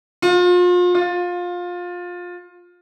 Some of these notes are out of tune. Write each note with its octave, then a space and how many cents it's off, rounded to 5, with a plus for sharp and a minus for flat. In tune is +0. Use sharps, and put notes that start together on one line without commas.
F4 +35
F4 +20